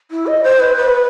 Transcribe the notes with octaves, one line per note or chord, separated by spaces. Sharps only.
E4
D#5
C5
B4
B4